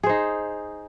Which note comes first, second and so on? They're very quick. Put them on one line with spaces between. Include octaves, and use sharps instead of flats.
G#4 C5 D#4